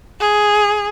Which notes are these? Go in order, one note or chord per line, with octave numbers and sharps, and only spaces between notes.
G#4